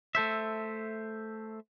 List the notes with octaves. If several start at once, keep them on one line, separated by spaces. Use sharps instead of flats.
A3 A4 C5 E5